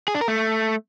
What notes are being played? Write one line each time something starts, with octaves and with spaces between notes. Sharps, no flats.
G#4
D4
A#4
A3